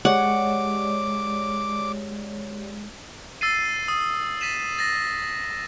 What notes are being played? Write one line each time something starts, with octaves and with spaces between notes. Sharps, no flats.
G#3 G4 C#5 D5 F#5 D6
E6 A6 C7 D#7
D#6
A6 B6 D#7 E7
A6 A#6